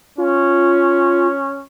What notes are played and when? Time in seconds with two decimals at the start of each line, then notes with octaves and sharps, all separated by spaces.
0.18 C#4 F4